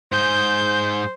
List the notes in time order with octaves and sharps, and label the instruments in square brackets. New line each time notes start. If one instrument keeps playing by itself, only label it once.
[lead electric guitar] G#2 G#4 [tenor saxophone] C5 [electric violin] G6